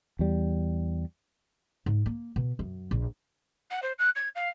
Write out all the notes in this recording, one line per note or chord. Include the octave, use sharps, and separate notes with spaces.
E2 G3
G#2
A#3
B2
F#2
A#1
F#5
C5
F#6
G#6
F5